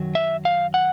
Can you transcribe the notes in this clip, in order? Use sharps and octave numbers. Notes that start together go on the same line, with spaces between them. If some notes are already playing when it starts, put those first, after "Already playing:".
Already playing: F#2 D#3 F#3
E5
F5
F#5